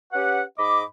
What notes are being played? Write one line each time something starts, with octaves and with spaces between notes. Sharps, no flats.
C#4 G4 B4 F#5
G#2 D#5 B5 D6